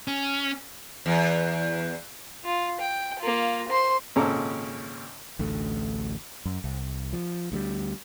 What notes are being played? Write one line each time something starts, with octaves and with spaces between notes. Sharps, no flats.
C#4
E2
F4
G5
A#3 F4
C5 C6
G#1 A#2 C#3 C#4 A4 A#5
A1 D2 A3
F#2
C2
F3
D2 F#3 G3